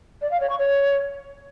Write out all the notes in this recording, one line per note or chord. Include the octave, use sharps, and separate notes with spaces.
D5
F5
C#5
C#6
C#5